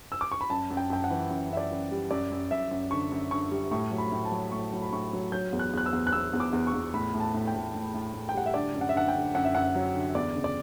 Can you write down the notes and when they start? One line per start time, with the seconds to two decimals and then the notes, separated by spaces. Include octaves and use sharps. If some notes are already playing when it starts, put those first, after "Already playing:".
0.12 E6
0.21 D6
0.32 C#6
0.41 B5
0.49 F#2 A5
0.70 F#2
0.77 G5
0.90 F#2 G5
1.04 F#5
1.10 E3
1.30 F#2
1.51 F#2 E5
1.57 D5
1.71 F#2
1.91 G3
2.11 F#2 D5
2.32 F#2
2.51 F#2 E5
2.71 F#2
2.91 D3 C#6
3.12 F#2
3.31 D3 C#6
3.51 G3
3.71 A2 C#6
3.91 F#3
3.98 B5
4.12 A2
4.25 A5
4.32 F#3
4.52 A2 C#6
4.73 F#3
4.82 B5
4.93 A2 C#6
5.13 F#3
5.32 F#3 G6
5.53 E2
5.59 F#6
5.73 E2 F#6
5.86 E6
5.93 E2
6.07 F#6
6.12 E2 E6
6.33 E2
6.40 D6
6.53 E2
6.67 C#6
6.74 E2
6.94 A2 B5
7.14 A2
7.20 A5
7.34 A2
7.47 G5
7.54 A2
7.75 A2
7.94 A2
8.14 A2
8.29 G5
8.34 G3 F#5
8.46 E5
8.54 D3 D5
8.74 F#2
8.81 F#5
8.89 E5
8.95 D3 F#5
9.08 G5
9.15 D3
9.34 F#2 F#5
9.45 E5
9.55 F#2 F#5
9.75 F#3
9.95 D3
10.15 E2 D5
10.36 C#3
10.44 D5